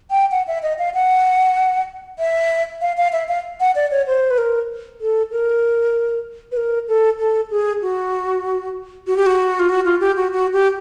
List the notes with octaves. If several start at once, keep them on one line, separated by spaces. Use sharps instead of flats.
G5
F#5
E5
D#5
F5
F#5
E5
F5
F5
E5
F5
F#5
D5
C#5
C5
B4
A#4
A4
A#4
B4
A#4
A4
A4
G#4
F#4
F#4
G4
F#4
F4
F#4
F4
G4
F#4
F#4
G4